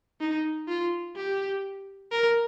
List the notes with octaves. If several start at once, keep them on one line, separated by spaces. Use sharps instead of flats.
D#4
F4
G4
A#4